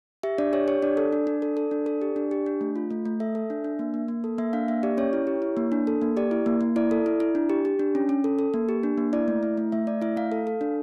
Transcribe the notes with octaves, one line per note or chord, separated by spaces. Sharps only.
G4 E5
D4 D5
G4 C#5
G4 C#5
D4 D5
A4
D4
D4
A4
A4
D4
A4
G4
D4
G4
D4
A3
F4
A3
A3
A4 E5
A4
D4
D4
A#3
A#3
A#3
A4
A#3 E5
D4 F5
A#3 E5
G4 D5
C#4 C#5
E4
G4
E4
A#3
D4
A4
A#3
G4 D5
E4
A#3
A#3
E4 D5
A4
E4
E4
D4
G4
G4
D4
C#4
C#4
A4
A4
A#3
G4
D4
A#3
E4 D5
A3
E4
A3
A3 E5
A3 D5
E4 E5
A3 F5
A4 F5
A4
D4